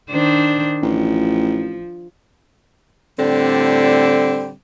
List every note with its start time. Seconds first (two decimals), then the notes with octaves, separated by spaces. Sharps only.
0.11 D#3 D4 C5
0.83 A1 F3
3.19 A2 D3 G3 C4